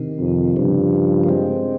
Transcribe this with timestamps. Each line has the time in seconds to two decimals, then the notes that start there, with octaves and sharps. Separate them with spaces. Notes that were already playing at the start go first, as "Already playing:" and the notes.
Already playing: C3 D#3
0.19 F2
0.56 G2 C#3 F3
1.24 A#3
1.29 G#3 C4